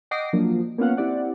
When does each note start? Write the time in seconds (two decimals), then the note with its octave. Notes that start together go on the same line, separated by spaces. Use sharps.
0.11 D#5 F#5 G5 D6 A#6 C7
0.33 F3 F#3 A#3 D4
0.78 A#3 B3 C#4 F4 F5 F#5
0.97 C4 E4 G4 D5 F#5